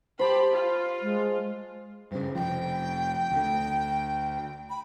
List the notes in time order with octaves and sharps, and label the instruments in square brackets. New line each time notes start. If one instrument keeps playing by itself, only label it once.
[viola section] G4 B5 [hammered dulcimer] C5 A5
[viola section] F4
[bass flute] G#3
[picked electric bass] G2 C#3 [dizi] C5
[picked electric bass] F1 B1 F3 [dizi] G5
[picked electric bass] D2 D3
[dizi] B5